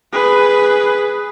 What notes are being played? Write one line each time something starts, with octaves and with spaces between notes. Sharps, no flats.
G#4 B4